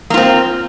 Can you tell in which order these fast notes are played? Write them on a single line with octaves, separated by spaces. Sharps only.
A#3 F4 C4